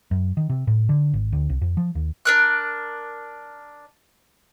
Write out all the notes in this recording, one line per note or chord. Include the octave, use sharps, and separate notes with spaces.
F#2
D#3
C3
A2
D3
G#1
D2
C2
F2
F3
D#2
D4 A#4 F#6